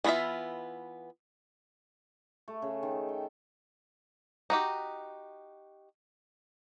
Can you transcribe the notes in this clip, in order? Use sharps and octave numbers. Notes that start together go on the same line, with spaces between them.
E3 B3 E4 F4 E5
A3
C#3
D#3
G5
D#4 F#4 G4